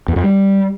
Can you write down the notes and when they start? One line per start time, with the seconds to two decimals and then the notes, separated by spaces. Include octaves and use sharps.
0.08 E2
0.16 F2
0.24 G3